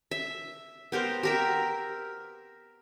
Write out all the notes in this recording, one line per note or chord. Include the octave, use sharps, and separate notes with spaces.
E5
B3 G4 A#4 C5
G4 A#4 E5